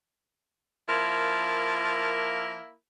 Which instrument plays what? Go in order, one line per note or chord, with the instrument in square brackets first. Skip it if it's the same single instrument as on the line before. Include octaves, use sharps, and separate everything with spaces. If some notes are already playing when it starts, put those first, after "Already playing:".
[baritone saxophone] F3 [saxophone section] A#3 E4 A#4